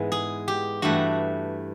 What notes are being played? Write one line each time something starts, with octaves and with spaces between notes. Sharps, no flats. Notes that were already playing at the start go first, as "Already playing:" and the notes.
Already playing: G#2 E3 G#3 B3
G#4
G4
G2 E3 A3 F#4